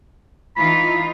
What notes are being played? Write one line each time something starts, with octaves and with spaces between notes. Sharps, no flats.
E3 D#4 F4 B5